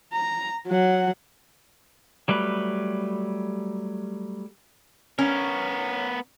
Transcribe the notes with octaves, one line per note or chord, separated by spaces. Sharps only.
A#5
F#3 F#5
F#3 G3 A3 B4
B3 C#4 A#4